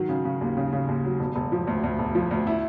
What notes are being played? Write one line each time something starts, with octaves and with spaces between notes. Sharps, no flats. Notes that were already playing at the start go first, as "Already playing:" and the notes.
Already playing: D#3 F#3
C#3
C#3
D#2
C#3
C#3
D#2
F#3
E1
E1
F3
D2
D2
E1
F3
D2
E4